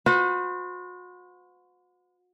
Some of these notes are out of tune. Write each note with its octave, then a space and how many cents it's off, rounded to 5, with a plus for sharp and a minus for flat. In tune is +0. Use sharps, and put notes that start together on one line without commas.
F#4 -40 C5 -45